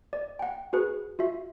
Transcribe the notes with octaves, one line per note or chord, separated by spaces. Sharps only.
D5
F#5 G5
F#4 G#4 B4
F4 F#4 E5